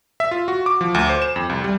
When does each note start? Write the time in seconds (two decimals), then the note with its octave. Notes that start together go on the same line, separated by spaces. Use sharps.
0.20 E5
0.31 F4
0.48 F#4
0.66 D6
0.81 F3
0.94 D2
1.09 C5
1.22 E7
1.36 F2
1.49 C2
1.64 G3